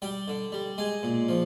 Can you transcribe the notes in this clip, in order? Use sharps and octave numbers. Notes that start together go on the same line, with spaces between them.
G3 G5
D3
G3
G#3 G#5
A#2
F3